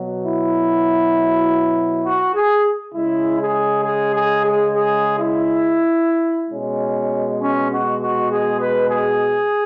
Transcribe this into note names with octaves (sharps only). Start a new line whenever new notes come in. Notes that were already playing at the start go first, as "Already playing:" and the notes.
Already playing: B2 F#3
E4
F#4
G#4
C#3 G#3 E4
G#4
G#4
G#4
G#4
G#4
E4
B2 G#3 C#4
C#4
F#4
F#4
G#4
B4
G#4